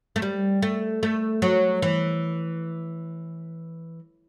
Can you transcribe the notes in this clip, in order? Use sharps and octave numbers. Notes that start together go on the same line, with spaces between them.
A3
G3
A3
A3
F#3
E3